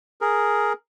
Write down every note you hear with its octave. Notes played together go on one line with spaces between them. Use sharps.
G#4 A#4